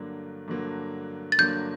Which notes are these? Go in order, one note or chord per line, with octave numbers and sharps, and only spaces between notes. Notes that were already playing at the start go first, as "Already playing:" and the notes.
Already playing: G2 D3 F#3 A#3
G2 D3 F#3 A#3
A6
G2 D3 F#3 A#3 G6